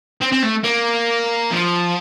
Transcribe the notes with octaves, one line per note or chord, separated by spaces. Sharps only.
C4
C4
A3
A#3
F3